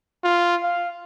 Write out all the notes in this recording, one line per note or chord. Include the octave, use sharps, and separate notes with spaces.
F4
F5